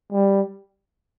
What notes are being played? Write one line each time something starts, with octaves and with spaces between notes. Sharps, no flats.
G3